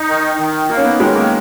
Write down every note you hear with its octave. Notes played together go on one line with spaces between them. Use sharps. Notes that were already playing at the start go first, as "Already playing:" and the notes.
Already playing: D#4
D#3
D#3
A#3 D#4
C#4
B3
D#3 G#3
A#3